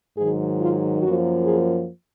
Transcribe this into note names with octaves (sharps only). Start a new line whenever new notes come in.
G#2 D#3 F#3 G#4
F4
F#2 F3 A#3 F#4
G#4